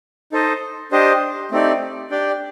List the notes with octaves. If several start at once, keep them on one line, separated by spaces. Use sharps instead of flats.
D#4 A4 C5 D#5
D4 G4 C5 D#5
A3 C4 D#4 G4 D5
D4 G4 D5 G5